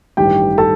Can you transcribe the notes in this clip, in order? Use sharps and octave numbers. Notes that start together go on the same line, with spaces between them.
A1 G2 D#3 G4 G5
A4 A5